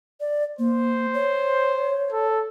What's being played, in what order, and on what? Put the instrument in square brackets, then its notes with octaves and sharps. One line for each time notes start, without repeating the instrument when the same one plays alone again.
[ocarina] D5
[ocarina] A#3 [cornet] C5
[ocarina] C#5
[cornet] A4